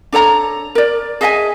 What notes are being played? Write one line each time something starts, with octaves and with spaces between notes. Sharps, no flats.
D4 A4 C#5 A#5
A#4 D5
G#4 D#5 E5 G#5